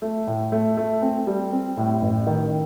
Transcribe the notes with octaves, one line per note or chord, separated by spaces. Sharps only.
A3
A2
A3
A3
C4
G3
C4
A2
A1
D#3